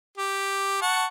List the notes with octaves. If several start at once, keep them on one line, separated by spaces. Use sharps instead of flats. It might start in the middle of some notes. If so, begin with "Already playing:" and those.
G4
F#5 A5 C#6